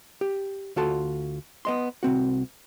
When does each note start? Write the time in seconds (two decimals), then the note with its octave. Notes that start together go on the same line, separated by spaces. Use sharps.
0.21 G4
0.76 D2 F4 F#4 A4 A5 C6
1.65 B3 D#5 C6
2.03 C2 C4 F#4